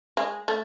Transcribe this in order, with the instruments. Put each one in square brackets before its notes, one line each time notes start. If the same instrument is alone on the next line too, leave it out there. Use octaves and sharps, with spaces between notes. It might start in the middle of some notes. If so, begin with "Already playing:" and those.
[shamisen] G#3
A3